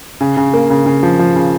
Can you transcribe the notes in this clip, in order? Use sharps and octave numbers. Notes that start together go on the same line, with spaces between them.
C#3
C#3
A#3
C#3
C#3
F3
F3
C#3